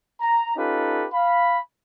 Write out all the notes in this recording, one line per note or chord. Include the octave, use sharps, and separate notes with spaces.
A#5
C#4 D#4 F4 G4 A4 B4
F5 B5